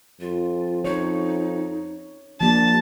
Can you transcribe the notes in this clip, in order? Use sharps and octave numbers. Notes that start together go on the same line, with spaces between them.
F2 F4
D#4 C#5
F3 A#3 D4 G4 A5